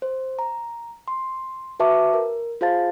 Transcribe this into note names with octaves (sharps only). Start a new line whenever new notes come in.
C5
A#5
C6
F#4 B4 E5 A5 C#6 D6
A#4
F4 G#4 C5 F5 A5 A6